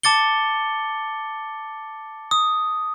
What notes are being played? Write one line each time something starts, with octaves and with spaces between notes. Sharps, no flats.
A5 D6 A6 C#7 G7
D#6